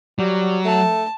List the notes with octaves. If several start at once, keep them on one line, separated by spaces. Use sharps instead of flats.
F#3 G3
A3 A5